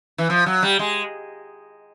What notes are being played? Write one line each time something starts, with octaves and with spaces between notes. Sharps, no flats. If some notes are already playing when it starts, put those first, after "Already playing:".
E3
F3
F#3
G3
G#3